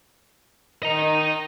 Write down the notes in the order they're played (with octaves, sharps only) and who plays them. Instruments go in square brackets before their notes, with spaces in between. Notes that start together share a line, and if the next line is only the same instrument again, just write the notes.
[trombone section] D#3 [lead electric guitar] D#5 A#5